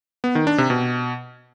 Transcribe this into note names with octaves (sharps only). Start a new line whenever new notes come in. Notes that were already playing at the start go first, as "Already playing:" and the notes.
B3
D#3
D4
C3
B2